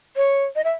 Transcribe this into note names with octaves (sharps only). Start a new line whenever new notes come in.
C#5
D#5
E5